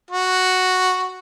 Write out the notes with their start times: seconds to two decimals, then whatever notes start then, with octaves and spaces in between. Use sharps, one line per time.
0.11 F#4